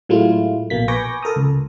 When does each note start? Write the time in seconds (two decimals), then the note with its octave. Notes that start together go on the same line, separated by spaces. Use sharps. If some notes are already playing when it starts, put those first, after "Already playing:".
0.09 A2 F#3 G#3 A3 E4 F4
0.70 A#1 B2 A#3 B6
0.88 B4 G#5 C#6 D6 G6 A#6
1.23 A4 A#4 A#5 D#6
1.36 C#2